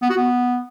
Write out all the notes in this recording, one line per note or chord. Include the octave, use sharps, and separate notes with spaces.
B3
F#4
B3